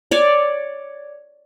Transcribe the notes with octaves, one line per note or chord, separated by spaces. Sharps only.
C#5 D5